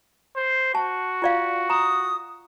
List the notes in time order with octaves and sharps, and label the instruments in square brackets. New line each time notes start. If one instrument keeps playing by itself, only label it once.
[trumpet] C5
[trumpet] F#4 [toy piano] A5
[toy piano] F4 D5 F5
[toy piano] A#5 [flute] D#6